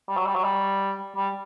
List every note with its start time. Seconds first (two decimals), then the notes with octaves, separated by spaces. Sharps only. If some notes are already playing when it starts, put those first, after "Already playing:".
0.08 G3
0.17 F#3
0.26 G3
0.35 F#3
0.44 G3
1.16 G3